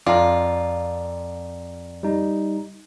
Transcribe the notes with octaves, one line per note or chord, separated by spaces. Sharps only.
F2 F4 D5 A#5
G3 D#4